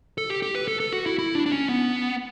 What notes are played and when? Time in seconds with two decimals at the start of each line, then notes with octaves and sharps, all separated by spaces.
0.18 A4
0.30 G4
0.42 G4
0.55 B4
0.68 A4
0.80 A4
0.93 F#4
1.06 E4
1.19 E4
1.35 D4
1.46 D4
1.52 C#4
1.69 B3